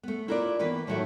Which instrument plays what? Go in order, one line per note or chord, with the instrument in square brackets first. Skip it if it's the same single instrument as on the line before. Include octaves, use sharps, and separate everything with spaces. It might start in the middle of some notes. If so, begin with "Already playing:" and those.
[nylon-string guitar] A3 B3
E4 F4 A#4 B4 C#5 D5
D#3 E3 A#3 B3 B4
A2 D#3 F3 F#3 A4 E5